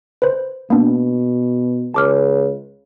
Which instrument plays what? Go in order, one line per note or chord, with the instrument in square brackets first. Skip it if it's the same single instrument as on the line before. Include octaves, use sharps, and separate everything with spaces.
[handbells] B4 C5
[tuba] B2 [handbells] A#3 B3 D4
[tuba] C#2 [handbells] A5 D6 F6